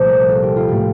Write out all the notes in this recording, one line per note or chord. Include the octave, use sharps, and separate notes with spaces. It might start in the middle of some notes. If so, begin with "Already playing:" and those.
Already playing: C2 A#2 F3 A3 C5
A#4
A4
G4
F4
A2 A3 G4